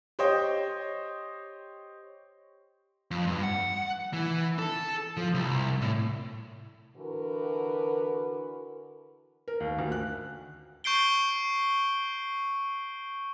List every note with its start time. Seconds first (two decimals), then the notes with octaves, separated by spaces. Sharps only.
0.19 G4 C5 C#5 D#5 G5
3.11 F2
3.27 G2
3.43 F#5
4.13 E3
4.59 A4
5.17 F3
5.34 C2
5.81 A2
6.96 D3 E3 F#4 A#4 B4
9.48 A#4
9.60 D#2
9.79 D2
9.92 F#6
10.84 C#6 G6 C7 D7 G7